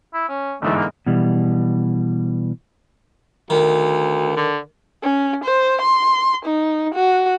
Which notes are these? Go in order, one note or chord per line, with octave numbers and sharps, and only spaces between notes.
E4
C#4
G1 G#2 E3 A3
A#3
B2 E3 G3
D2 D#3
D3
C#4
C5
C6
D#4
F#4